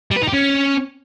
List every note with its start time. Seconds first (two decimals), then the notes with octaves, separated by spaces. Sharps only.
0.11 G3
0.17 B4
0.22 D#4
0.28 G4
0.33 C#4